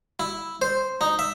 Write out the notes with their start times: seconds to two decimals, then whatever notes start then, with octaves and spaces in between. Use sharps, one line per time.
0.20 E4
0.62 C5
1.01 D#4
1.19 E5